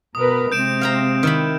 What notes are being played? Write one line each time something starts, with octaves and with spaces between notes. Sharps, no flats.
B2 A#4 B4 D#6
C3 G#3 C4 G6 D7 E7
F5 G5 A#5
D#3 E4 B5